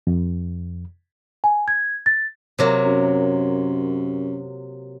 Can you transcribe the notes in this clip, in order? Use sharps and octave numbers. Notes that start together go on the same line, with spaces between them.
F2
G#5
G#6
A6
C3 F#3 A#3
F#2